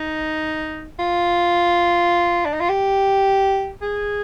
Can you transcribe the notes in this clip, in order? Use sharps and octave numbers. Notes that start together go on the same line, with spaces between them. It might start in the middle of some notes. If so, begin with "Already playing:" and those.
Already playing: D#4
F4
D4
D#4
F4
G4
G#4